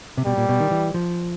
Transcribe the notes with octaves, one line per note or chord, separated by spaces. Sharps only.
C3
B2 G3
A#2
B2
D#3
E3
F3